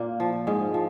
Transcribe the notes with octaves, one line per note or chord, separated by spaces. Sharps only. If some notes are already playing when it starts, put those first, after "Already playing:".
Already playing: A#2 A#3
F3
G#2 G#3
F3